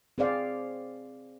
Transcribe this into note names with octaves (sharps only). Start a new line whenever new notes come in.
C4 G#4 C5 D5 F5